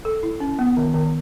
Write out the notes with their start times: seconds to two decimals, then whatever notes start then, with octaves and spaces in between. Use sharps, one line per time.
0.05 A4
0.23 E4
0.40 C#4
0.59 B3
0.77 D#3
0.94 D#3